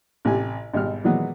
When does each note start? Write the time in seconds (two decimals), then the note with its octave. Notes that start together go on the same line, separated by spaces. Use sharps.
0.25 A1 C3 G4 G#5
0.73 G#1 B2 G3 F6
1.04 A#2 E3 F#3 G#3 B3